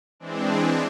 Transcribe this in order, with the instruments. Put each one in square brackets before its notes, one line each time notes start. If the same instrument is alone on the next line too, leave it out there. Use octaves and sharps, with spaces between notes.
[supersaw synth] E3 G#3 C4 D4